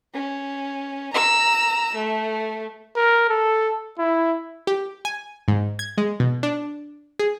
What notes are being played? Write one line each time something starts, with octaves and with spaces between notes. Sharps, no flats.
C#4
A#5 E6
A3
A#4
A4
E4
G4
G#5
G#2
G#6
G#3
B2
D4
G#4